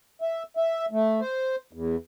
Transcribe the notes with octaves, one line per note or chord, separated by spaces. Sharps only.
E5
E5
A3
C5
E2